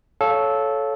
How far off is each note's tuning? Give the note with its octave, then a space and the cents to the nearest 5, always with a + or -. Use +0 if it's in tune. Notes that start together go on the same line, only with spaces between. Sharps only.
A4 -15 C#5 +0 F5 +0